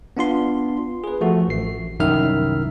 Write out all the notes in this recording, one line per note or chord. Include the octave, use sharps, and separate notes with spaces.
B3 D4 F4 C6
G#4 B4
F3 A3 F#4
A1 C7
C2 F#2 D#3 E4 E5 F6